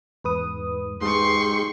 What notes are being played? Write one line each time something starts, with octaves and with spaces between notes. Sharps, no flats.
E2 G#2 B4 D#6
G#2 G#3 G4 C6 C#6